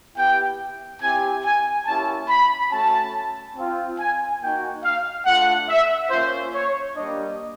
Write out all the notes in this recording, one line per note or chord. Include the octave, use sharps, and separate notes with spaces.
B3 E4 G4 G5
C4 E4 G4 G#5
G#5
A#3 C#4 E4 G4 A5
B5
A3 C#4 F#4 A5
C4 F4
G#5
A#3 D#4 F#4 G5
F5
A3 D4 F4 F#5
E5
A#3 C#4 F4 C5
C#5
G3 A#3 D4 D#5